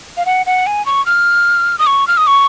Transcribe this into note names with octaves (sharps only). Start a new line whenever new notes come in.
F5
F#5
F#5
G#5
C#6
F6
D#6
C#6
F6
D#6
C#6